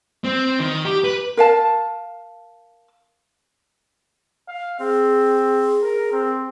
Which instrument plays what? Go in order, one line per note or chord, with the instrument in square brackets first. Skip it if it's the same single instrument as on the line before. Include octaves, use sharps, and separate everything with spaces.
[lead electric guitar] C4
D#3
G4
B4
[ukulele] A#4 F5 A5
[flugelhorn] F5
[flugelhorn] C4 [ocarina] G#4
[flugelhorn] A#4
C4